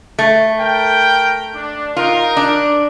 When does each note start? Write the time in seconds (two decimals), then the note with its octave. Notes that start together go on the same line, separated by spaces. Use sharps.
0.19 A3
0.59 A#4 G5
1.55 D4
1.96 D#4 F4 A#4
2.37 D4